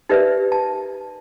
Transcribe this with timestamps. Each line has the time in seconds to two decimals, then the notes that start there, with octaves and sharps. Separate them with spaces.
0.09 D#4 G4 A#4 B4 D5 E5
0.52 A5